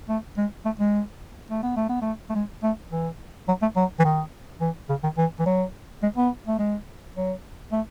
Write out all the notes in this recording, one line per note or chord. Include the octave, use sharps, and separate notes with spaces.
A3
G#3
A3
G#3
A3
B3
A3
B3
A3
A3
G#3
A3
E3
F#3
A3
F#3
E3
D#3
E3
C#3
D#3
E3
E3
F#3
G#3
B3
A3
G#3
F#3
A3